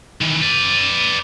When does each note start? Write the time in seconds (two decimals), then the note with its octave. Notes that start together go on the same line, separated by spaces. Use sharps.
0.21 D#3 E3
0.42 B4 D5